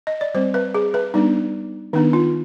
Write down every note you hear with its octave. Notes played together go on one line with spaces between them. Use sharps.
D#5
D5
G3 C4 C5
B4
G#4
B4
G3 B3 D4 D#4
D#3 B3 D4 D#4
F4